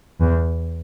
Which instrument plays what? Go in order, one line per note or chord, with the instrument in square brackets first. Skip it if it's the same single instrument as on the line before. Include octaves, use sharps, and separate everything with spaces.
[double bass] E2